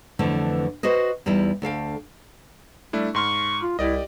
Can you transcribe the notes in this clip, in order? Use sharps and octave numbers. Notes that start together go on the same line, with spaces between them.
F2 D3 E3 A3 B4
F#4 B4 C5 D#5
E2 G3 D#4 E4
D2 A4 F5 G5
G3 A3 D4 E4
G#2 C6 C#6 F6
F4
C2 E4 G4 D5 D#5